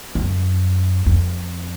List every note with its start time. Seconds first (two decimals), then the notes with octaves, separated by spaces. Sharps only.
0.15 F#2
1.06 F2